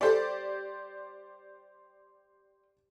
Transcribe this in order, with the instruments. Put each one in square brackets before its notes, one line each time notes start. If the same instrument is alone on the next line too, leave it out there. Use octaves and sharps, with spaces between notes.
[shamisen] G3 A4 [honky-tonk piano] G4 C5 D5